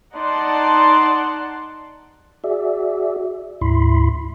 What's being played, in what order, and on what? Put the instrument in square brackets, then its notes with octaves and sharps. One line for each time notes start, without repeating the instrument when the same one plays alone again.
[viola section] D#4 D5 F#5 A5 C6
[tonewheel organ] F#4 G#4 D5 E5
D2 G#2 E4 B5 C6